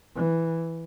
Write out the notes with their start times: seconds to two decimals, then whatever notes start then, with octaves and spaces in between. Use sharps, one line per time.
0.15 E3